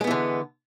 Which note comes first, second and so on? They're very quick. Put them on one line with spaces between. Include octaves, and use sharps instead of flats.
G#3 B3 E3 D3